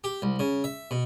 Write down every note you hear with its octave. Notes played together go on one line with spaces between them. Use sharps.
G4
C2
C#3
E5
B2